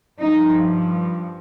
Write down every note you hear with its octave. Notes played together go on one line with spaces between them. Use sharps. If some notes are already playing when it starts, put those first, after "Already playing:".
G2 F3 D#4